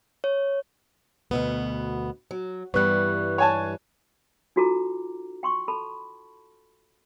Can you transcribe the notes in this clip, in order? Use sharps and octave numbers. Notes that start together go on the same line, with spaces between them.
C#5
D2 B2 B3
F#3
G2 E3 G3 B3 C#6 F#6
C#5 G#5 A5
D#4 F4 F#4 A4 A#5 D6
G5 C6 C#6
A4 A5 B5